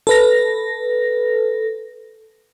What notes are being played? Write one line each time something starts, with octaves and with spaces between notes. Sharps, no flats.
A4 B4 A#6